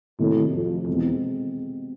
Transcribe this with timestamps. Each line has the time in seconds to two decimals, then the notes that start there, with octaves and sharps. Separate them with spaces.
0.19 A2 C3 D#3 F#3 A#3
0.53 F2
0.87 E2 B2 G#3 C4